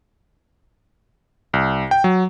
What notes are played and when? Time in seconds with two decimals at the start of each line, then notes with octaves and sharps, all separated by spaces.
1.53 C2
1.91 G5
2.04 F#3